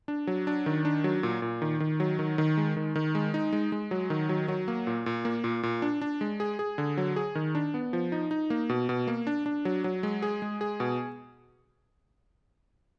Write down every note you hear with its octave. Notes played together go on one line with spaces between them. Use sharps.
D4
F#3
D4
D#3
D4
F#3
A#2
A#2
D#3
D#3
F#3
D#3
D#3
G#3
D#3
D#3
G#3
D#4
G#3
G#3
F#3
D#3
F#3
F#3
A#3
A#2
A#2
A#3
A#2
A#2
D4
D4
G#3
G#4
G#4
D3
F#3
G#4
D#3
D4
B3
F3
D#4
D#4
A#3
B2
B2
A#3
D4
D4
F#3
F#3
G#3
G#4
G#3
G#4
B2